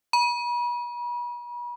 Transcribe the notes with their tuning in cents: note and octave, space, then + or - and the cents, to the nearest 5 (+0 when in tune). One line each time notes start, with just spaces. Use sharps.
B5 -40